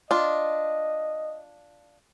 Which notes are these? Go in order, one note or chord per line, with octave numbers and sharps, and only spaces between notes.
D4 F4 D#5